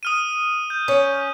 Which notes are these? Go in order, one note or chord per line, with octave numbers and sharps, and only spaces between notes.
D#6 F6 D#7
G6
C#4